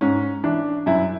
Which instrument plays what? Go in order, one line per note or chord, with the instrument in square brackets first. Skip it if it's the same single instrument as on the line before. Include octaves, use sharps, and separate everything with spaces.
[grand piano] G#2 C#4
E3 D4
F#2 E4